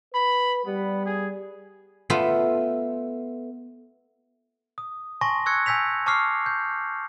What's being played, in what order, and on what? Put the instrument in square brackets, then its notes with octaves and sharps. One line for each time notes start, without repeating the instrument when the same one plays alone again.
[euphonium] B4 [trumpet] B5
[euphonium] G3 [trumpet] B3
[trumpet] G#4
[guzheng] A3 B3 F4 A4
[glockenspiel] D#6
G#5 A5 C6 C#6 A#6
C#6 E6 F#6 G#6 C#7
G#5 E6 G6 B6 F7
A5 C#6 D6 E6 F6 C7
G6